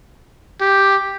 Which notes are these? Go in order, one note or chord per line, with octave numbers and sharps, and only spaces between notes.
G4